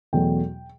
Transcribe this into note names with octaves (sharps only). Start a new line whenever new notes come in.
E2 B2 F#3 A3 G5